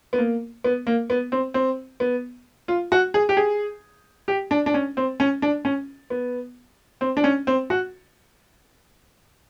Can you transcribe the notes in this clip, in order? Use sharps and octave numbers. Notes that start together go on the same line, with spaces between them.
B3
A#3
B3
A#3
B3
C4
C4
B3
F4
F#4
G#4
G4
G#4
G4
D4
D4
C#4
C4
C#4
D4
C#4
B3
C4
D4
C#4
C4
F#4